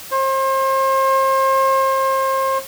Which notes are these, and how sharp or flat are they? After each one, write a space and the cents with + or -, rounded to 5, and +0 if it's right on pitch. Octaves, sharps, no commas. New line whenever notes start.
C5 +35